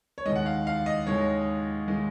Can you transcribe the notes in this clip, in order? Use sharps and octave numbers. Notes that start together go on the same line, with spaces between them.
C#5
D#2 D#3 G#3 D#5
F#5
F5
F5
D#5
D#2 D#3 G#3 C#5
D#3 G#3